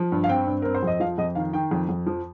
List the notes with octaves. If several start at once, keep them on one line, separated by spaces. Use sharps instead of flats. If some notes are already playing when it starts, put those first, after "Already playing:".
Already playing: F3
G2
F5
C4 G5
G2
C4 A#4
C5
F2 D#5
F3 F5
F2 D#5
D#3 F5
D#3 G5
F2
F2
F3